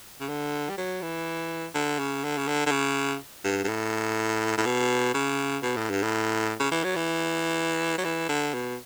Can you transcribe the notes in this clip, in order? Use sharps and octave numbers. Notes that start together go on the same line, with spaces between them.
C#3
D3
G3
F#3
E3
D3
C#3
D3
C#3
D3
D3
C#3
G2
G2
A2
A2
B2
C#3
B2
A2
G2
A2
C#3
E3
F#3
E3
F#3
E3
D3
B2